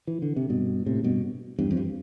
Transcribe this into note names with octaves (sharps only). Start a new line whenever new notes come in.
E3
D3
C3
G2 B2
A2 C3
G2 B2
E2 G2
F2
G2